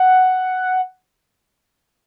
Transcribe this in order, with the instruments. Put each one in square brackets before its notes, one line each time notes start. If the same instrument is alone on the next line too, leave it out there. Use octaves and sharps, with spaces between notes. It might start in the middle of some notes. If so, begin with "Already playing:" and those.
Already playing: [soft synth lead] F#5